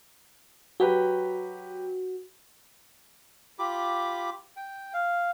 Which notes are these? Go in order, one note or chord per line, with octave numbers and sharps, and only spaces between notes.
F#3 F#4 G4 B4
F4 G4 B5 D6
G5
F5